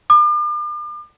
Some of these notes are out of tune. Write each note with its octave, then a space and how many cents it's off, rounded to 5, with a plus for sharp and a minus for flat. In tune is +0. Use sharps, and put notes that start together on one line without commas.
D6 +40